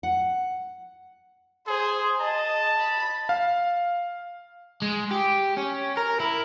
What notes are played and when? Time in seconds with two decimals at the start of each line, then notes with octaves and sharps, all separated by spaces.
0.03 F#5
1.67 G#4 C5
2.20 D#5 A5
2.79 B5
3.29 F5
4.82 G#3
5.11 G4
5.57 C#4
5.97 A#4
6.20 E4